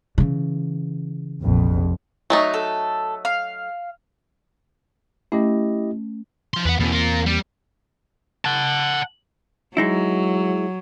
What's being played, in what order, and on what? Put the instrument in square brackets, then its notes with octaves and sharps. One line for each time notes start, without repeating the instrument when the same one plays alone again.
[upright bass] C#3 E3
[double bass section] F1 A#1 F2
[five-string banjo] F#3 A3 D#4
[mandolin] A4
F5
[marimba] A3 C#4 [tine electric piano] E4 G4 D#5
[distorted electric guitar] F3 C6
[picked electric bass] E2 [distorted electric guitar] B4 F#5
[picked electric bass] E2 A#3 C4 [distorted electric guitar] B2 E3
[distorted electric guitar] F4 A#4
G3
[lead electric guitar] F#5 A5
[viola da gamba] F#3 [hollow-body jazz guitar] G#3 D#4 E4